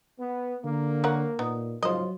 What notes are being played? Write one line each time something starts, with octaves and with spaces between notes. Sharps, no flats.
B3
D3 A#3
A#4 C#5 F#5
A#2 B3 D#4
G#2 C#3 F#3 F4 C5 D#5